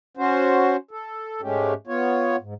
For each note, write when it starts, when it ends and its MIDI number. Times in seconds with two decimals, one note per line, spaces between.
0.17 0.76 61
0.17 0.76 66
0.17 0.76 72
0.91 1.41 69
1.42 1.74 44
1.42 1.74 56
1.42 1.74 57
1.42 1.74 61
1.42 1.74 67
1.87 2.36 59
1.87 2.36 65
1.87 2.36 73
2.40 2.54 44